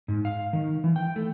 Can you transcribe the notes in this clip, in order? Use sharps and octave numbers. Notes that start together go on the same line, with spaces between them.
G#2
F5
D#3
E3
G5
A3